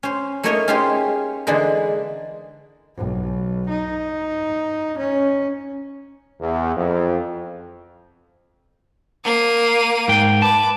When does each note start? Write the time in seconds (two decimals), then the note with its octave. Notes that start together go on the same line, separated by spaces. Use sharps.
0.03 C#4 C5
0.44 A3 A#3 D#4 A#4 C#5 D#5
0.68 C#4 D#4 F4 G4 G#4 C5
1.47 D3 E3 G#3 A#3 D4 D#4
2.96 B1
3.69 D#4
4.98 C#4
6.40 E2
6.75 F2
9.24 A#3 D#7
10.08 G#2 G5
10.42 B4 A5 D6